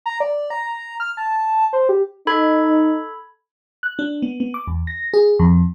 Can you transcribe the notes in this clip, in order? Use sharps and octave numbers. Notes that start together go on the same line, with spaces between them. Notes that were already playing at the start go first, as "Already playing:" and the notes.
A#5
D5
A#5
F6
A5
C5
G4
D#4 A4 B5 G#6
F#6
D4
B3
B3
D6
E2
A#6
G#4
F2